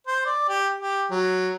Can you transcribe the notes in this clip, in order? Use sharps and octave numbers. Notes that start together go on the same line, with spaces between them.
C5
D5
G4
G4
F#3